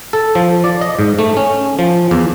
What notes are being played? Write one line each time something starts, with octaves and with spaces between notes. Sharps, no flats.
A4
F3
D5
D#5
G#2
A3
C#4
F3
E2